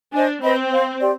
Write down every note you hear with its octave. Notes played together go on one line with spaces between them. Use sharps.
D4 C5 D#5 G#5
C4 B4 D#5 B5
C5 F5 C6
G4 D5 G5 C6